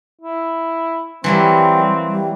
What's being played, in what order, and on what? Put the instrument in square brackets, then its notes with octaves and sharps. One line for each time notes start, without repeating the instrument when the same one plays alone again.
[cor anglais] E4
[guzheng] E3 F#3 A#3 [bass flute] G3 [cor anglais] C4
[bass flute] G3